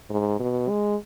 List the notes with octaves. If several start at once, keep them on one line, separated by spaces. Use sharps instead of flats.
G#2
B2
G#3